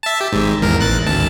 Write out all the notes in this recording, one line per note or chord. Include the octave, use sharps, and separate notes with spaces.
E5 A5
G4
G#1 G#2
G#1 E2 A#4
A1 F#6 A6
G#1 D2 A5